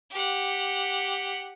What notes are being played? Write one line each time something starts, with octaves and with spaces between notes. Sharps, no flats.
G4 F#5